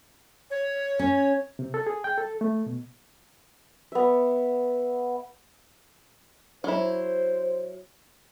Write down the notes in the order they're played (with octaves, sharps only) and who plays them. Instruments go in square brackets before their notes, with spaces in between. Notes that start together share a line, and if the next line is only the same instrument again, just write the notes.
[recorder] C#5
[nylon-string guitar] C#4
[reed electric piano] C3
A4
G#4
G5
A4
A3
B2
[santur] B3 E5
[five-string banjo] F#3 E4 [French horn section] C5